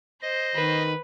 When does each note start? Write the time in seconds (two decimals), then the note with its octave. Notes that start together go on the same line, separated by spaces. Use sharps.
0.22 C5 D#5
0.56 D#3 B4